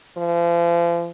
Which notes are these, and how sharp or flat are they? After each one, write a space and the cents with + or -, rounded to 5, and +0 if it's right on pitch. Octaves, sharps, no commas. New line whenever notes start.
F3 -35